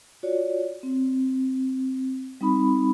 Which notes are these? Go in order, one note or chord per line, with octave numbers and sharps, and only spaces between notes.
F4 F#4 C#5 D5
C4
G3 C4 D#4 B5